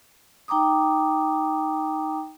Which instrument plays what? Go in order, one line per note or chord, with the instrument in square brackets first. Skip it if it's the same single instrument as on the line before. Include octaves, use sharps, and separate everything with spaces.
[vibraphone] D#4 G5 A#5 D6 D#6